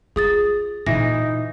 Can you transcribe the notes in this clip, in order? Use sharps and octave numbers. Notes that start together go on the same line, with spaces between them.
F4 G#4 D#6 A6
A#2 E3 D#4 A#6